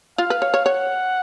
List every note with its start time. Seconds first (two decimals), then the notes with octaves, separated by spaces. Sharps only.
0.18 F4 F5
0.30 B4
0.42 C#5
0.54 C#5
0.66 C#5 F#5